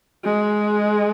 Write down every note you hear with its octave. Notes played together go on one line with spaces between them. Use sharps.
G#3